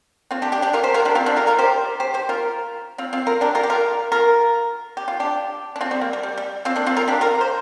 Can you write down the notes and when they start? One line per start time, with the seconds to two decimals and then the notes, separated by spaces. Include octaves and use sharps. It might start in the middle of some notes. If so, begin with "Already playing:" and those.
0.31 C4 F4
0.42 D4 G4
0.52 D4 G4
0.62 D4 G4
0.73 F4 A#4
0.83 G4 C5
0.94 F4 A#4
1.05 D4 G4
1.15 C4 F4
1.26 D4 G4
1.36 F4 A#4
1.47 F4 A#4
1.59 G4 C5
2.00 G4 C5
2.14 G4 C5
2.29 F4 A#4
2.98 C4 F4
3.13 C4 F4
3.27 F4 A#4
3.41 D4 G4
3.55 F4 A#4
3.63 G4
3.70 F4 A#4
4.12 F4 A#4
4.97 G4
5.08 F4
5.20 D4 G4
5.76 D4
5.81 C4 F4
5.91 G3 C4
6.01 A#3
6.13 G3
6.23 G3
6.38 G3
6.65 C4 F4
6.76 A#3 D4
6.87 C4 F4
6.97 F4 A#4
7.08 D4 G4
7.21 F4 A#4
7.41 C5